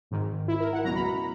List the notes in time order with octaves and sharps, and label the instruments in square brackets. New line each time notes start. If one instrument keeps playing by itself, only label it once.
[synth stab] G#1 G#2 D#3
E4
A#4
F#5
C#2 B2 F#3 A#5
B5
A#5